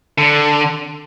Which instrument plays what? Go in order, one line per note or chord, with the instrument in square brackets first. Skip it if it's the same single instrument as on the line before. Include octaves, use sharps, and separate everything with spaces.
[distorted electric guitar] D3